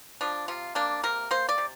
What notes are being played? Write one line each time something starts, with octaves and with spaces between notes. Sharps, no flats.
F3 D4
C3 F4
A#3 D4
C3 A#4
A#3 C5
D5
C3